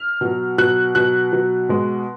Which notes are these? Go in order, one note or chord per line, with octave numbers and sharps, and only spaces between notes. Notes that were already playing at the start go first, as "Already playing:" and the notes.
Already playing: F6
B2 F#3
B2 F#3 F#6
B2 F#3 F#6
B2 F#3
B2 G#3